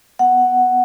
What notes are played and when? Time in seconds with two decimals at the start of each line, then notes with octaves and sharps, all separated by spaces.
0.19 B3 F#5
0.46 B3